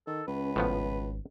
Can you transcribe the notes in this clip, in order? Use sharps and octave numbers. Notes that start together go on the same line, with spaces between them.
D#3 A4
C#2 C#4 B4
G#1 A2 F3 B3